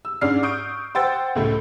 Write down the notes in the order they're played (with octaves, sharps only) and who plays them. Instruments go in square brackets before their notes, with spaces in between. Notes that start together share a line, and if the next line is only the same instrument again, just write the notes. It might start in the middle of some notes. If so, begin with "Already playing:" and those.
[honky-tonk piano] E6
G#2 C#4 D4 D5 F6 C7
C#6 D#6 G6 D7
C5 F#5 G5 C6 E6 A6
C#2 A2 A3